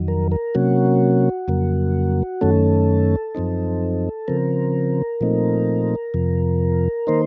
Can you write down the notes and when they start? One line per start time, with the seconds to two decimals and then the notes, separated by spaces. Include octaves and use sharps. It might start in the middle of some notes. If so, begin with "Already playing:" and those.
Already playing: F2 D#3 F#3
0.08 A#4
0.32 A#4
0.55 C3 F#3 A#3 C#4 F#4
1.48 F2 C#3 F#3 A#3
2.41 F#2 D#3 A3 C#4 A4
3.35 F#2 F3 C4 D#4
4.28 C#3 F3 C4 A#4
5.21 A#2 F3 A3 C4 D#4
6.14 F2 C3 F3
7.07 D#3 A#3 D#4 C5